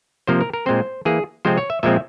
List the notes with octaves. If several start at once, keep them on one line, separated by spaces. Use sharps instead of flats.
C3 F3 A#3 C5
A#4
A#4
A#2 G#3 C4 C5
E3 A#3 G#4
C3 F3 G#3 C4 C5
C#5
E5
A#2 F3 G#3 C4 E5